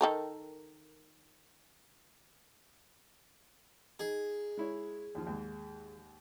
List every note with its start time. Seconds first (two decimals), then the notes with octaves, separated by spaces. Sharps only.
0.01 D#3 A4 A#4
3.99 D#4 G#4
4.57 G#3 E4 C#5
5.15 D#2 F3
5.27 D#2 G#2